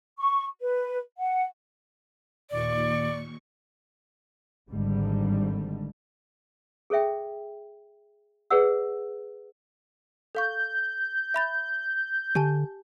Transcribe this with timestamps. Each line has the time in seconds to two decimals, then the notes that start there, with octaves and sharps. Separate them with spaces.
0.18 C#6
0.60 B4
1.18 F#5
2.50 D#2 A#2 D5 C#6
4.71 G#1 G#2 D3 G3
6.90 G#4 A4 C#5 E5 G5
8.51 G#4 B4 C#5 D5 F#5 E6
10.35 A4 F5 C#6 G6
11.34 E5 B5 A6
12.35 D3 G4 G#5 A5